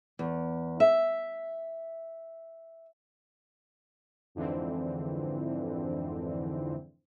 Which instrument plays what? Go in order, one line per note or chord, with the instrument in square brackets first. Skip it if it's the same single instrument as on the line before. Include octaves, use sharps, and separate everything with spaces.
[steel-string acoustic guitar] E2
E5
[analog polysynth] F2 G#2 D3 E3 C4